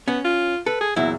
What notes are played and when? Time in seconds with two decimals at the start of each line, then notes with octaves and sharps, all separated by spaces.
0.08 B3 C#4
0.24 F4
0.66 A4 B4
0.81 G#4
0.96 E2 A#2 F#3 E4